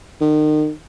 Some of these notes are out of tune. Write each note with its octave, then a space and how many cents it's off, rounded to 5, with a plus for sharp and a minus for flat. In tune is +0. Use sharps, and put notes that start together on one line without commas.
D#3 -35